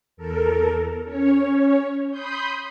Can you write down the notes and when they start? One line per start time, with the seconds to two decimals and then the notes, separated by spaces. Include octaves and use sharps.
0.17 E2 A4 A#4
1.04 C#4 C#5
2.10 B5 C6 D#6 G6